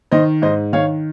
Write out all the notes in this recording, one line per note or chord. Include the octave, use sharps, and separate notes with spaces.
D#3 C5 D#5
G#2 C5 D#5
D#3 C#5 F5